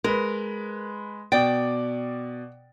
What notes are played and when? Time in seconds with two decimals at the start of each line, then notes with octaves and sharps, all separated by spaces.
0.04 G#3 A#4 B4
1.32 B2 D5 G5 A6